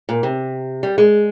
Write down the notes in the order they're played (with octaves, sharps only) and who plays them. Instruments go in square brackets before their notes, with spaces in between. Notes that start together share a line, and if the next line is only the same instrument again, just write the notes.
[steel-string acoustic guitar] A#2
C3
G3
G#3